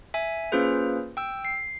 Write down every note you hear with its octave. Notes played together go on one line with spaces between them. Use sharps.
E5 G#5
A#3 C#4 F4 G#4 B4 C5
G5 E6
C7